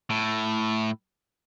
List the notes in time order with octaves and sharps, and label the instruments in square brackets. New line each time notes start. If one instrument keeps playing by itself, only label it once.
[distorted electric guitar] A2